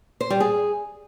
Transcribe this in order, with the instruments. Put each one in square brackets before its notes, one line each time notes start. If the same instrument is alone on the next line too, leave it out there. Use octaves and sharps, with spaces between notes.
[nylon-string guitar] C5
G3
G#4